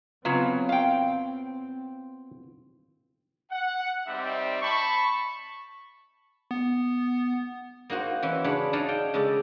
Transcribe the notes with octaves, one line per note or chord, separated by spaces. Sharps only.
C#3 F#3 B3 C4 F4
F5 G5
F#5
G3 C4 D#4 D5 E5
A5 B5 C#6
B3
A#3 D#4 F#4 C5
E3 C#4 E4
C#3 D4 C#5 B5
D4 D#4 C#5 D5 F5
G5
C#3 G#3 A4 D5